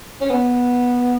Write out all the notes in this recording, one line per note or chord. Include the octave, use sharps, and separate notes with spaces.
C#4
B3